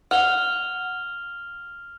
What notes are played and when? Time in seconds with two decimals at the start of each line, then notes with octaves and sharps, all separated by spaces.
0.11 F#5 F6 F7 G7